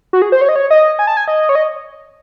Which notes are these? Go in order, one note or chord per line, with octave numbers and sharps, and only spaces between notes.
F#4
G#4
C5
C#5
D#5
C#5
D#5
G#5
A5
G#5
D#5
C#5
D#5